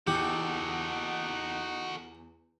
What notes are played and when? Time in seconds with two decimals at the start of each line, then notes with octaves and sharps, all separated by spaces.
0.07 E2 D#4 F#4 G4 A4 F#5